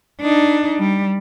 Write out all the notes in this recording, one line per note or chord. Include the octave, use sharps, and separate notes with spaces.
D4 D#4
G3